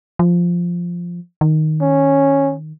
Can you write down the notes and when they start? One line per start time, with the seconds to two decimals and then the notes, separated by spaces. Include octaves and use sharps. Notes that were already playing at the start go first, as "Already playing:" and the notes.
0.19 F3
1.41 D#3
1.82 C#4